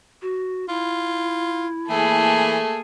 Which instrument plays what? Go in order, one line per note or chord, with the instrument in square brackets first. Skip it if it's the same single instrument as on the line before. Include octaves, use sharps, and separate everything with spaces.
[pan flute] F#4
[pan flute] E4 [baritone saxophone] F4
[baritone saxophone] E3 [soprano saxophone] A3 [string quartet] A#3 G#4 A4